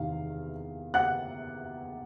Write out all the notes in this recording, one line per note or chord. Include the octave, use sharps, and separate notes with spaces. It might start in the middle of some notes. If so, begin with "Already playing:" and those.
Already playing: E2 C3 D#3 F5
F#5 F#6